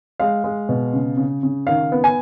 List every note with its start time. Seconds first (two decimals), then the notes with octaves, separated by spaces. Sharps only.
0.20 G#3 F5
0.44 G#3
0.69 B2
0.93 C#3
1.17 C#3
1.43 C#3
1.67 D#3 F5
1.92 B3
2.04 G#5